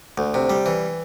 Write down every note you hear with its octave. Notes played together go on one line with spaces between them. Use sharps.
D2
C3
G3
E3